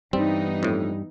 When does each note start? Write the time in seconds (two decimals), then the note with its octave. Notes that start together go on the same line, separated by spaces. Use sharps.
0.13 G2 E3 G3 B3 C4 D#4
0.63 F2 A2